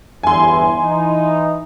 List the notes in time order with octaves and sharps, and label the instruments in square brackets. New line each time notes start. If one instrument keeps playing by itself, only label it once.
[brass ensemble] G1 E2 E3 [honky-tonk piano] G#5 C6
[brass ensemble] E3 D#4